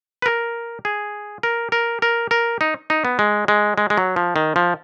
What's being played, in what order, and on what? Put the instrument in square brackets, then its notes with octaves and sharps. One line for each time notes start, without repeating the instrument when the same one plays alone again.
[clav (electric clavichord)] B4
A#4
G#4
A#4
A#4
A#4
A#4
D#4
D#4
B3
G#3
G#3
G#3
G#3
F#3
F3
D#3
F3